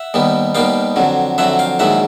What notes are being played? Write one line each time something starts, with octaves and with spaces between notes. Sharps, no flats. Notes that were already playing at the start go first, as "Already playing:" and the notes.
Already playing: E5 F#5
D#2 D#3 G3 B3
D#2 D#3 G3 B3 F5 G5
F2 D3 F#3
F2 D3 F#3 E5 F#5
F5 G5
A#1 G#2 D#3 F#3 E5 F#5